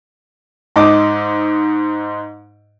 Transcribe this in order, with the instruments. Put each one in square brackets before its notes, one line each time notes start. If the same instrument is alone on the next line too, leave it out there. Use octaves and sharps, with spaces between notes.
[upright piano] G#2 D#5 D6